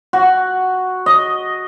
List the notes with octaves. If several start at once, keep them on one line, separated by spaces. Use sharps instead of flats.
F#4
D#5